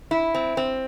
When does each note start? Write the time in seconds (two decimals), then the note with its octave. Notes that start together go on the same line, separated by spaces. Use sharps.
0.11 E4
0.35 C4
0.57 C4